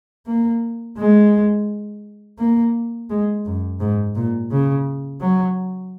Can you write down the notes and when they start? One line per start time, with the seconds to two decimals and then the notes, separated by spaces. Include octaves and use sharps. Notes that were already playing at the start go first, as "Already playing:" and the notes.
0.27 A#3
0.98 G#3
2.39 A#3
3.10 G#3
3.46 F#2
3.80 G#2
4.16 A#2
4.51 C#3
5.21 F#3